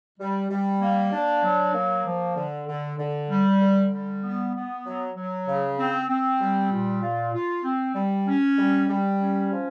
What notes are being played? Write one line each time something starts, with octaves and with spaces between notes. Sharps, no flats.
G3
G3
A#3
D4
F#3
A#3
F3
D3
D3
D3
G3
D3
G3
B3
B3
F#3
F#3
C#3
C4
C4
G3
A#2
F4
F4
C4
G3
C#4
G3
G3
C#4
F3